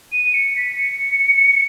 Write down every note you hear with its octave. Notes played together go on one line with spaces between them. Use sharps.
D#7
C#7
B6
C#7